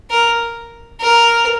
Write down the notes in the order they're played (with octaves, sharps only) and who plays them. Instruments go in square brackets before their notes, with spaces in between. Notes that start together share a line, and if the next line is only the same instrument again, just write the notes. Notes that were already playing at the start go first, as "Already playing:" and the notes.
[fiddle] A#4
A#4